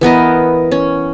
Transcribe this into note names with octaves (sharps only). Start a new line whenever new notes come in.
E3 B3 A#4 D#5
C#4